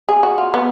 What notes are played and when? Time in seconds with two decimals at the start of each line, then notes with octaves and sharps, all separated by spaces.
0.09 G#4
0.23 F#4
0.38 F4
0.54 B3